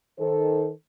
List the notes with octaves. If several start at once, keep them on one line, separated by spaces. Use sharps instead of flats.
D#3 A4 C5